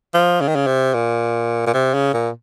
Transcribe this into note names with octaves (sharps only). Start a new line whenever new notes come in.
F3
C#3
D#3
C#3
C3
A#2
A#2
C3
C#3
A#2